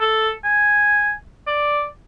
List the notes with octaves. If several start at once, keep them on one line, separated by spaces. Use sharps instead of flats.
A4
G#5
D5